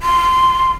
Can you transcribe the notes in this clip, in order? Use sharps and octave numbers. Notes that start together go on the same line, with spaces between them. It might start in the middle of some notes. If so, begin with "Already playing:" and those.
C6